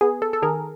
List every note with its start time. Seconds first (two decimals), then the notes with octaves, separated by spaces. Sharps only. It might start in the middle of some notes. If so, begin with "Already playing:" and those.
0.01 B3 G#4
0.22 A4
0.33 A4
0.42 D#3 G#4 A#4